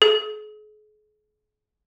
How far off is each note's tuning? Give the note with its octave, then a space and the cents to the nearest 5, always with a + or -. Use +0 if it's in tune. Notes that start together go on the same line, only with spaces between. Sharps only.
G#4 +40